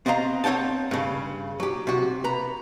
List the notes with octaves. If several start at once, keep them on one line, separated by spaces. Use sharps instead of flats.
B3 C4 D#5 F5 A#5
C4 C#5 F#5 G5 A5
G2 C#3
F#3 G4
C3 F#4
B4 A#5